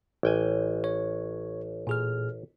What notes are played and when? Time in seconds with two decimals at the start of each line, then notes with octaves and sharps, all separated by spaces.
0.23 A1 G5 G#5
0.84 C#5
1.87 A#2 G#4 F6